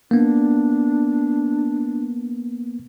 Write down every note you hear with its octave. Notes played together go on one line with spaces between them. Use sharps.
A#3 B3 D4